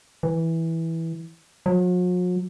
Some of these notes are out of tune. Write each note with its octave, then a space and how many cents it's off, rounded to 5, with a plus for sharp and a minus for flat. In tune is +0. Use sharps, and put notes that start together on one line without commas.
E3 -10
F#3 -45